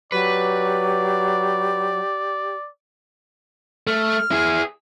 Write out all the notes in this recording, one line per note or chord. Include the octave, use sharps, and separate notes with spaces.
F#3 G4 B4 D5
A3 F6
E4 G#4